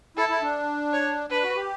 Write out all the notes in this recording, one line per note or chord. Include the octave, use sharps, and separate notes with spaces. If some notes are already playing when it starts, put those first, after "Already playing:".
E4 A4
E4
D4
C#5
D4 B4
F#4
G4